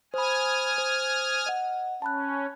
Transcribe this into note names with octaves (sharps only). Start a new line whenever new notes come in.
C5 G#5 B5 D#6 F6
C5
D#5 F#5
C#4 A5 B5 F#6